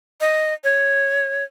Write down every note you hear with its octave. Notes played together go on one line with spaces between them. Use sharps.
D#5
C#5